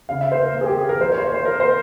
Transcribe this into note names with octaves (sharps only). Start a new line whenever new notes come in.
C#3 F5
E5
A#3 C5
A#4
A#3 C5
G#4
G4
A#3 G#4
A#4
F3 C5
C#5
C5
A#3 C#5
C5
A#3 A#4
C5